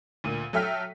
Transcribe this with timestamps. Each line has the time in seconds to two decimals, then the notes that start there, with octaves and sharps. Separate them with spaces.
0.24 D2 A#2 D#7
0.53 F#3 A4 E5 G5 F6 B6